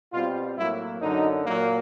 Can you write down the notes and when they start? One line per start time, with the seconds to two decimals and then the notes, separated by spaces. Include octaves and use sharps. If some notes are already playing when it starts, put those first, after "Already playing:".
0.13 B2 G3 C4 F4
0.57 A2 F#3 A#3 E4
1.01 F#2 D3 F#3 D#4
1.45 A#2 F#3 A#3